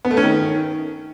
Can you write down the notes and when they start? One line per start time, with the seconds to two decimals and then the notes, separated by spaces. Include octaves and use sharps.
0.05 B3
0.11 A3
0.17 C#4
0.23 D#3